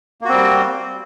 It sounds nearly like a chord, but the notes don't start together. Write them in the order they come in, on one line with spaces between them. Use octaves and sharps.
A#3 F#4 C4 G3